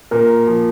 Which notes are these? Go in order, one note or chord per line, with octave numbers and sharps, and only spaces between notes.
A#2 A#4
F3